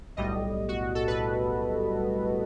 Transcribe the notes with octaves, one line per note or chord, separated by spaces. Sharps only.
B1 A2 G3 D#5
F#4
A4
B4